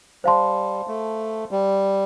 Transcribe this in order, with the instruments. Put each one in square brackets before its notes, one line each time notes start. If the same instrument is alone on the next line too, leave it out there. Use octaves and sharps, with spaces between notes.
[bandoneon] G3 [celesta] C5 F5 A5 C6
[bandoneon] A3
G3